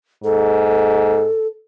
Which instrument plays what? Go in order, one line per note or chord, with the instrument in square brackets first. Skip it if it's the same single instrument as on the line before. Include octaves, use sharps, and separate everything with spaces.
[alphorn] G#2 [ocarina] A4